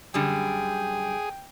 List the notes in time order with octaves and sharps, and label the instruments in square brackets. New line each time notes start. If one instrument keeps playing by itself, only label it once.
[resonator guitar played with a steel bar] F#2 D3 G3 [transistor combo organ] G#4 [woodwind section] G5